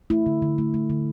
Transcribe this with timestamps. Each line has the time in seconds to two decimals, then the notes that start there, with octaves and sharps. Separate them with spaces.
0.10 A3 E4
0.26 D3
0.42 D3
0.58 A3
0.74 A3
0.90 D3